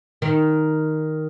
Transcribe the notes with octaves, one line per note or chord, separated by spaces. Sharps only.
D#3